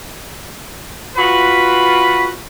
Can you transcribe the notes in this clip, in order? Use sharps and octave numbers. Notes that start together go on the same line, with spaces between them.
F4 F#4 B4 B5